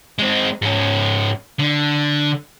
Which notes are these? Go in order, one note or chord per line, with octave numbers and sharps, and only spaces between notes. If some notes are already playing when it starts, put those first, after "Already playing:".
G#3 C4
G#2 C#4
D3